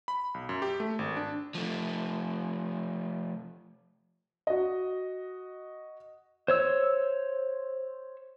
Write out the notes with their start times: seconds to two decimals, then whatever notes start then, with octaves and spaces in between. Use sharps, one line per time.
0.08 B5
0.34 B1
0.49 F#2
0.62 G4
0.80 A3
0.99 G#1
1.17 D4
1.55 F3 A3
4.47 F#4 D#5
6.48 C5 C#5 E6